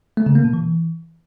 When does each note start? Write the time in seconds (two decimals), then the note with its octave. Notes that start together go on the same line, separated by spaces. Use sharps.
0.17 A3
0.26 C#3
0.35 A#3
0.44 B2
0.53 E3